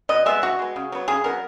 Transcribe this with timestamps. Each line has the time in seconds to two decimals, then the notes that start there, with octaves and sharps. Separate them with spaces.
0.09 B2 D#5
0.26 G#3 B3 E5
0.42 B2 F#4
0.59 G#3 B3
0.76 C#3
0.92 F#3 B3
1.08 C#3 G#4
1.24 F#3 B3 A#4